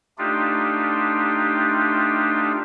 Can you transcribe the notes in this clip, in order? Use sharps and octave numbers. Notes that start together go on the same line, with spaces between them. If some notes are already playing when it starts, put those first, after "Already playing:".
A3 D4 D#4 F4 G4